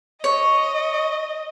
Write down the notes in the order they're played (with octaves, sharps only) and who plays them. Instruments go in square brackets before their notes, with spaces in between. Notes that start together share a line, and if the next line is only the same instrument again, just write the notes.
[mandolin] C#5 [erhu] D#5